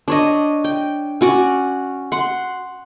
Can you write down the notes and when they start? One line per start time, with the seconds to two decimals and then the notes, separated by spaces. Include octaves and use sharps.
0.08 D4 C#5 D#5
0.64 G5
1.21 C#4 F#4 D5
2.12 F#5 C6